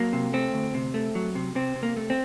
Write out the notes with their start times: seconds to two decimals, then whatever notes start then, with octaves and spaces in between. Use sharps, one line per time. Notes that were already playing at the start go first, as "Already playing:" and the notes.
Already playing: F#3 A#3
0.13 C3
0.33 A3 C4
0.54 D2
0.74 C3
0.94 A3
1.15 F#3
1.35 C3
1.55 C3 C4
1.76 C3
1.83 A#3
1.97 A3
2.10 C4